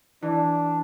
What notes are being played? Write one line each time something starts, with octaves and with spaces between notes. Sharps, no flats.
E3 D4